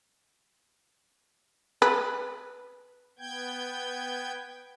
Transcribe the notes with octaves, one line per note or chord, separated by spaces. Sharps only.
B4
B3 G5 G6 G#6